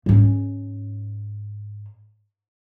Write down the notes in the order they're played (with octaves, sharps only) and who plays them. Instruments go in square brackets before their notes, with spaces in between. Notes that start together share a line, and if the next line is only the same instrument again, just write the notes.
[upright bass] G#2 C#4